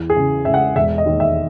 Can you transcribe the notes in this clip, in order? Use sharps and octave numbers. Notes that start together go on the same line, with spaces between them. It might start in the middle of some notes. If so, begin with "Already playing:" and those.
Already playing: E2 E3
G#4
C#3
C#3 E5
F#5
E1 E5
D#5
D#2
E5